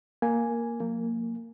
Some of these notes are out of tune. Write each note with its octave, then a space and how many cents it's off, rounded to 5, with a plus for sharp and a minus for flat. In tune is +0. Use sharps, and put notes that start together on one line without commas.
A#3 +0 G#5 +0
F3 +40 A#3 -20